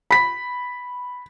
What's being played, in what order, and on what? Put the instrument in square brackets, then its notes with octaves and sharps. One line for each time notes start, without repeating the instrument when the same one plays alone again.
[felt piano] B5 B6